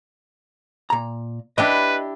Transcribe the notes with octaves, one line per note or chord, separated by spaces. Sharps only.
A#2 A#5
D4 E4 G4 B4 D#5